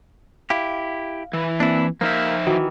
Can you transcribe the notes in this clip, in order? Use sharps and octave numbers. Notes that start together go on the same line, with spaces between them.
E4 G4 F5
E3
A#3 C4 D4 E4
F3 A#3 D#4 E5 F6 G6
D#3 E3 F#4